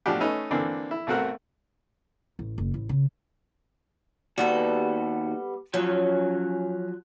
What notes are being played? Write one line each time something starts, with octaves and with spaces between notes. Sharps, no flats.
A2 F3 D4 F#4 G4
A3 C#4 D#4 B4 E5
D3 E3 A#3 C4 D4
E4
B1 A3 C4 F#4 A#4 F#5
A1
F#1
A1
C#3
D#2 G3 B3 F#4 A4
F3 F#3 C#4